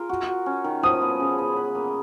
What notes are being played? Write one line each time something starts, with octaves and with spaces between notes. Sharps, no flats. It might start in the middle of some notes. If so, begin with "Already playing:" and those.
Already playing: F4 G#4 A#4
F#4
F#4
C#4
D#3
F3 D#6
B3
C#3
B3
B4
A#3